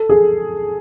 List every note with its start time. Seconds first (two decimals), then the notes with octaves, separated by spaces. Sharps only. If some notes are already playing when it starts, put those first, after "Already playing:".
Already playing: A4
0.09 G#4